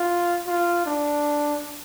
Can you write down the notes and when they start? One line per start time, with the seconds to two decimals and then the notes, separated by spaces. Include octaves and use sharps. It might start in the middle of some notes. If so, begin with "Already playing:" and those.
Already playing: F4
0.47 F4
0.86 D4